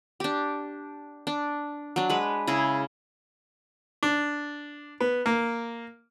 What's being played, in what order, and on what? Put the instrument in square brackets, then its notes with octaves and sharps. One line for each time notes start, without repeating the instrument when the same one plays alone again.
[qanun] D4 G4
D4
F#3 D4
G#3 B4
C#3 E4 G#4
[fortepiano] D4
B3
A#3